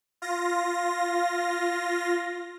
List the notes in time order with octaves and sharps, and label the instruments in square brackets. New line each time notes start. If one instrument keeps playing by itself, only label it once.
[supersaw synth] F4 A#6